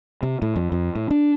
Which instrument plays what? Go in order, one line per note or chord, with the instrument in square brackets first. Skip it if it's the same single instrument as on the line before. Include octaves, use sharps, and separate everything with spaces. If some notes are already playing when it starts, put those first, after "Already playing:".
[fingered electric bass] C3
A2
F2
F2
A2
D4